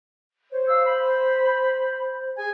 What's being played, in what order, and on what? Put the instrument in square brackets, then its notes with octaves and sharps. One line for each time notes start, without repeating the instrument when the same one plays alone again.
[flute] C5 [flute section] C#5
[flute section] F5 E6
B5
G#4 G#5 G#6